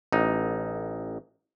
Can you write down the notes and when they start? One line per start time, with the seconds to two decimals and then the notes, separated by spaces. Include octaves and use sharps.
0.12 A1 D#4